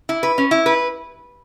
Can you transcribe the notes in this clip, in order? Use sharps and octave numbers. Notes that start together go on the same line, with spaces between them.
E4
B4
C#4
E4
B4